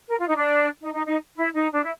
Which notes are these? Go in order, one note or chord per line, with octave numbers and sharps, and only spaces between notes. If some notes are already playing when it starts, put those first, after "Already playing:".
A#4
F4
D#4
D4
D#4
D#4
D#4
E4
D#4
D4
E4